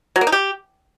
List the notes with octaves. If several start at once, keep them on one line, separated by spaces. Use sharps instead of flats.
F#3
A#3
D#4
G4